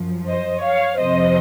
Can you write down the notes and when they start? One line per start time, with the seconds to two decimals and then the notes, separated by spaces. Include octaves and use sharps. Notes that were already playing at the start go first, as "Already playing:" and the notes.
Already playing: F#2 F3
0.27 C5 D#5
0.63 C#5 F5
0.98 F2 C3 F3 C5 D#5